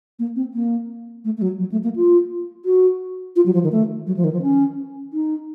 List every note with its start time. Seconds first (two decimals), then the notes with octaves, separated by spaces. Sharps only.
0.19 A#3
0.36 C4
0.54 A#3
1.25 A3
1.37 A3
1.42 F#3
1.59 F#3
1.72 A3
1.84 A#3
1.96 F4
2.65 F#4
3.36 F4
3.46 F#3
3.54 F3
3.63 D#3
3.72 A3
4.07 F#3
4.16 F3
4.24 D#3
4.33 F3
4.42 C#4
5.13 D#4